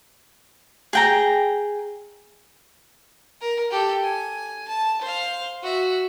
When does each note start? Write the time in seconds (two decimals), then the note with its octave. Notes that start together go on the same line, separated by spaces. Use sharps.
0.93 G#4 G5 A#5
3.41 A#4
3.71 G4 A4
4.04 G#5
4.68 A5
5.02 C5 F5
5.63 F#4 E5